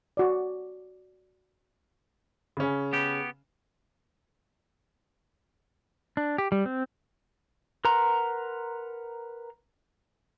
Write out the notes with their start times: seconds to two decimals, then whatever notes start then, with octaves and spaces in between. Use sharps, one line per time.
0.17 F#4 D5
2.57 C#3 C#4
2.93 B3 G4
6.17 D4
6.38 G4
6.52 G3
6.66 C4
7.85 A#4 B4 F#5 A#5 C6